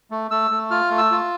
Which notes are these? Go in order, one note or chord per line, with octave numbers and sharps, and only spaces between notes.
A3
A3 E6
A3
F4 F6
A3
E6
F4